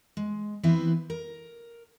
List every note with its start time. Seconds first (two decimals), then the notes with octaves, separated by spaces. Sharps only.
0.17 G#3
0.63 E3 B3 C4 E4 B4 C5
1.10 A#4